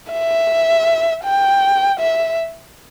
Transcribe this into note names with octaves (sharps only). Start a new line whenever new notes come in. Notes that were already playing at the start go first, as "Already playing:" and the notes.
E5
G5
E5